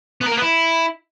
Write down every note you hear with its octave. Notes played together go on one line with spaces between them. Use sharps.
B3
A#4
A#3
B3
E4